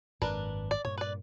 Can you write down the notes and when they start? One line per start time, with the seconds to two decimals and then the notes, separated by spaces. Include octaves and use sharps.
0.22 G#1 F#2 D4 A#4 B4
0.71 D5
0.85 G2 A#2 C#5
0.98 B4 D5